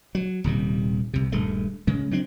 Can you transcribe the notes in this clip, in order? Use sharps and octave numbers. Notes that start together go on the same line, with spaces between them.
F#3
D#1 D#2 C3 G3
C2 C3
D#1 G2 G#3 A3
C#3 G#3
F#3 C4 D4